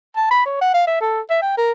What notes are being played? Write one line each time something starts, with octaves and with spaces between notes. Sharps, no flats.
A5
B5
C#5
F#5
F5
E5
A4
E5
G5
A#4